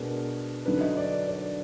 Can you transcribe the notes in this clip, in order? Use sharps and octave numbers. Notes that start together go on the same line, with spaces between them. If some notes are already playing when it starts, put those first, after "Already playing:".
Already playing: B2 G#3 B3 D4 A#4
D3 F#3 D4 B4
D#5
D5
D5